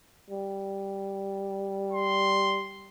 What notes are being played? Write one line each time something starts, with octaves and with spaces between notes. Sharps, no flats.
G3
C6